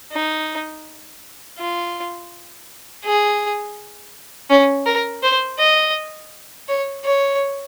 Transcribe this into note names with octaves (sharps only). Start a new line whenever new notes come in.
D#4
F4
G#4
C#4
A#4
C5
D#5
C#5
C#5